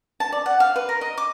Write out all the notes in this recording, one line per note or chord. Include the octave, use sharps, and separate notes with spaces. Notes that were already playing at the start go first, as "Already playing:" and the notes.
A5
D5
F#5
F5
B4
A#4
D#5
D6